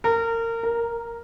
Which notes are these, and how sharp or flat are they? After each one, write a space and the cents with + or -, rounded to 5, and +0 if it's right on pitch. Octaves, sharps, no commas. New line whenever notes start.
A#4 -25
A#4 +0